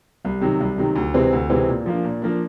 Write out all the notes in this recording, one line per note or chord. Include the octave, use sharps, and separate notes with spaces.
C2
C3 D#3 F#3
C2
C3 D#3 F#3
D2
C3 E3 G#3 C4
D2
C3 E3 G#3 C4
A#2
F3 A#3 D4
A#2
F3 A#3 D4